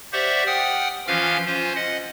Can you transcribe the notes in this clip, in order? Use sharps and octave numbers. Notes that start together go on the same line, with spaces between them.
G4 C5 D5 E5 F#5 C#6
F#5 G5 D#6 F6
E3 F3 C#4 F4 F5 F6
C#4 F4 C5
D#5 F#5